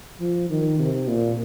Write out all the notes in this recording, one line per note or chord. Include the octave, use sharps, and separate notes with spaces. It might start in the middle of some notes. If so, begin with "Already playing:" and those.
F3
D#3
C3
A#2